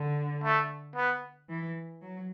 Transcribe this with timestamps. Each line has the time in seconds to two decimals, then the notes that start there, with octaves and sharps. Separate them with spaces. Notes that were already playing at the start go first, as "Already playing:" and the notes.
Already playing: D3
0.44 A3
0.96 B3
1.49 E3
2.03 F#3